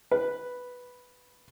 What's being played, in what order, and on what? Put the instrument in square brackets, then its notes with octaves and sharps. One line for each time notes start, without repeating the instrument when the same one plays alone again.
[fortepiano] B4